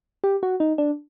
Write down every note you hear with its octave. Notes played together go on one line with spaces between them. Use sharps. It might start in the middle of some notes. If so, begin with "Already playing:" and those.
G4
F#4
D#4
D4